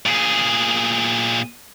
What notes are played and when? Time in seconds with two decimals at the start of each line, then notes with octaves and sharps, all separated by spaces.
0.06 A#2 G#4